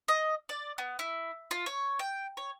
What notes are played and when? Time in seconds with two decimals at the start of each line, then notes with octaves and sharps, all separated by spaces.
0.08 D#5
0.49 D5
0.78 B3
0.99 E4
1.51 F4
1.66 C#5
1.99 G5
2.37 C#5